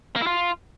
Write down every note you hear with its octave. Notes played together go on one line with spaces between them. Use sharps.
A#3
E4
F4